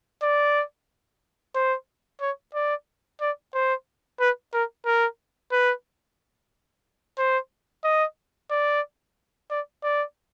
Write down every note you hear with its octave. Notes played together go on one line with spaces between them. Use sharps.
D5
C5
C#5
D5
D5
C5
B4
A#4
A#4
B4
C5
D#5
D5
D5
D5